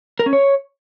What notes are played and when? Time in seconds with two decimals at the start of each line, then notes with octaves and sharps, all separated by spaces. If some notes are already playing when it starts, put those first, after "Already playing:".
0.19 A#4
0.26 C#4
0.33 C#5